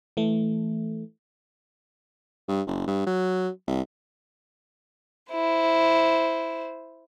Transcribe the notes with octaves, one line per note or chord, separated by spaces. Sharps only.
E3 A3
G2
F#1
G2
F#3
C2
E4 C5